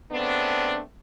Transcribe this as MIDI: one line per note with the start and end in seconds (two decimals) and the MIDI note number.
0.12 0.80 49
0.12 0.80 57
0.12 0.80 59
0.12 0.80 60
0.12 0.80 62